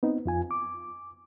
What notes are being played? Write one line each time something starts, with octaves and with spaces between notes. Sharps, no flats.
B3 C4 D#4
F2 F4 G#5
D6